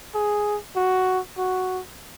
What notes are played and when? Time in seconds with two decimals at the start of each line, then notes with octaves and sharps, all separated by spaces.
0.14 G#4
0.76 F#4
1.38 F#4